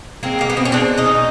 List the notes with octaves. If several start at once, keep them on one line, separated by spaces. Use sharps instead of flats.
G#3 A#3 C4
B2 A#3
B3
B2 C4
C#4
G#3 C4 D4
G#3
C#4 D#4
B2